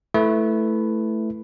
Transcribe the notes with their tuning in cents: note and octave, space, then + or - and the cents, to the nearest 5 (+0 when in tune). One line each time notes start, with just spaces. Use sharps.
A3 +0 E4 +0 B4 +0